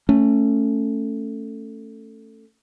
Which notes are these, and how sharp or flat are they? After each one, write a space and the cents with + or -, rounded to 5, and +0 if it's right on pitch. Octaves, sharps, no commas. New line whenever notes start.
A3 +15 C#4 +0